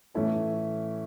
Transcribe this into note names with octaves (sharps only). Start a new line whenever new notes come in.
A2 E3 A3 C#4 E4 A4